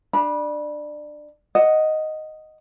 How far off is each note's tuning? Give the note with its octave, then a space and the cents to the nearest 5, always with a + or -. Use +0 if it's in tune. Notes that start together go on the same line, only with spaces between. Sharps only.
D4 +20 B5 -25
D#5 +0 F#5 +0